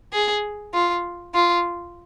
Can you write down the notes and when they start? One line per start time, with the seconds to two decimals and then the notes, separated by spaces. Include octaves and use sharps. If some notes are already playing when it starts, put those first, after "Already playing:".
0.13 G#4
0.74 F4
1.35 F4